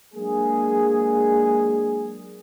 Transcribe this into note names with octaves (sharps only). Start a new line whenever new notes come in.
F#3 G#3 A#3 D4 G#4